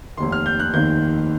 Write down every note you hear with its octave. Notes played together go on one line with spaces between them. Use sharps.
F1 D#2 D#3 C6
F6
G6
F#6
F1 D#2 D#3 G6